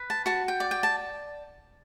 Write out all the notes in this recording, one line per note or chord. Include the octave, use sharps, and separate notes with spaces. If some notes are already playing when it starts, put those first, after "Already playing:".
Already playing: B4
A5
F#4 A5
G5
D5
G5
A5